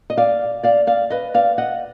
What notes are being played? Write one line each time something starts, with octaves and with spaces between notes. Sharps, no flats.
D#5
D5 F5
D5 F5
D5 F5
B4 D#5
D5 F5
D#5 F#5